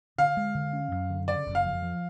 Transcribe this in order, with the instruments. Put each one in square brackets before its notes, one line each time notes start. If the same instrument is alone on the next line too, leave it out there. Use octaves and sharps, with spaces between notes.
[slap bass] D3 [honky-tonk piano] F5
[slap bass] G#3
D3
C#4
F#2
D3
[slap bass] C#3 [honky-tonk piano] D5
[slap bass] F#1
[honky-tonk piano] F5
[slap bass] F2
F3